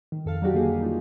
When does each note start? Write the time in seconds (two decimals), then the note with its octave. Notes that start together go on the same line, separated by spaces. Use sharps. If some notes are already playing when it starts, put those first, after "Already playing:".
0.12 D#3
0.26 F2 A4 F5
0.42 F#3 G3 D4 D#4 F#4 G4
0.54 D3 A#3 G4 G#4
0.80 F#3 D#4 F4